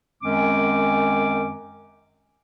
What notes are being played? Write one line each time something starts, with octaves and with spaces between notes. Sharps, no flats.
F#2 D#3 G#3 C4 C#4 D6